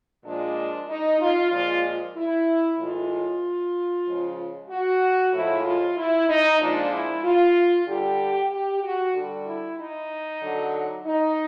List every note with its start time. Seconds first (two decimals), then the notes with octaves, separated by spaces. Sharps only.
0.25 A#2 F3 G#3 D4
0.88 D#4
1.20 F4
1.51 A#2 F3 G#3 F4
2.16 E4
2.78 A2 E3 G#3 F4
4.06 C#3 F3 G#3
4.70 F#4
5.33 A2 F3 G#3 E4
5.66 F4
5.97 E4
6.29 D#4
6.61 A#2 F3 G#3 D4
6.92 E4
7.24 F4
7.87 D3 G3 G4
8.51 G4
8.83 F#4
9.14 D3 G3
9.46 E4
9.79 D#4
10.41 D3 F#3
11.05 D#4